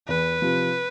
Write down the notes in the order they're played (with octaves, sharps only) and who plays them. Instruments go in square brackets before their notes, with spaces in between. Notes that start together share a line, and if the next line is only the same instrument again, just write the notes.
[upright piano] E2 [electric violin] B4
[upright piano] C3 F3